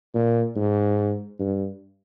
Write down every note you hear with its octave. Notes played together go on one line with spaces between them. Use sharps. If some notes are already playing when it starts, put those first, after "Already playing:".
A#2
G#2
G2